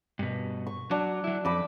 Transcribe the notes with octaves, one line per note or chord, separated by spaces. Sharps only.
G2 B2
C#6
F#3 D4
F#3 E4
F2 B5 D6 E6